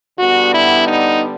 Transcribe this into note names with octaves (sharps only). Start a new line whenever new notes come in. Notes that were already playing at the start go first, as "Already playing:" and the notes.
D3 G3 B3 F#4
E4
D#4